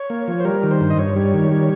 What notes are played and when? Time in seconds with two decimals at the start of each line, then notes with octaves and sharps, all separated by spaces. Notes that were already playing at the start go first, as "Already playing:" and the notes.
Already playing: C#5
0.10 A#3
0.28 F3
0.40 C5
0.45 G3 A#4
0.63 D#3
0.71 C5
0.81 G2
0.90 D#5
0.97 G2 C#5
1.16 G3
1.34 D#3
1.52 G3